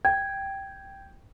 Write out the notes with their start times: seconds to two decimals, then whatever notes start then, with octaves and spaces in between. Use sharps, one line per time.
0.05 G5 G#6